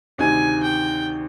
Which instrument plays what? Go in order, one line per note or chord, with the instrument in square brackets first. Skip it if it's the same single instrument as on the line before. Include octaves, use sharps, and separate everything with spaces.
[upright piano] D2 C3 D#3 [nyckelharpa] G#5
[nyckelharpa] G5